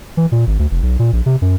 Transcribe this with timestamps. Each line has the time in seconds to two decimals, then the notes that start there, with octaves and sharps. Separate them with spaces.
0.17 E3
0.32 A#2
0.47 G#1
0.59 D2
0.71 F1
0.83 B1
0.99 A#2
1.13 A#1
1.26 C3
1.42 F#2